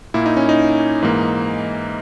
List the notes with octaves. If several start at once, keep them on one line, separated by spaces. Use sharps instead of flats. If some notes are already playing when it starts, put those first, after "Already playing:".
A#2 A#3 E4
D#4
C#4
D#4
G#2 E3 A#3